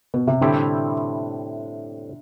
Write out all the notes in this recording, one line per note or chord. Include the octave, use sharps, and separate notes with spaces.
B2
C3
A2 D3 G3 C4 E4 G4